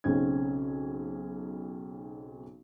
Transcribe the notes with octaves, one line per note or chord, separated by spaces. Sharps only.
B1 C#3 C4 C#4 D#4 G#6